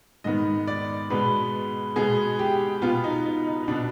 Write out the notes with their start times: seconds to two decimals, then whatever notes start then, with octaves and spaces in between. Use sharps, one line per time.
0.24 G#2 D#3 B3 D#5
0.67 D5
1.10 B2 G#3 B3 B4
1.96 B2 G#3 B3 G#4
2.39 G4
2.82 B2 B3 F4
3.04 D#4
3.25 D#4
3.47 D#4
3.63 D#4
3.68 B2 B3 D4